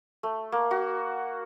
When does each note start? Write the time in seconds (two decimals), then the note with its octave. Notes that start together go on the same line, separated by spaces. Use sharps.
0.23 A3
0.52 A#3
0.71 F#4